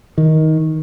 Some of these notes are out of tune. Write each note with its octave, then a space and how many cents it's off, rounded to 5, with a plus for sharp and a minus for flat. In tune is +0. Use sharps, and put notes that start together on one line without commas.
D#3 +15